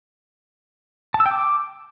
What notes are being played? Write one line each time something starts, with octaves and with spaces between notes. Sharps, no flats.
A5
E6
G5
D6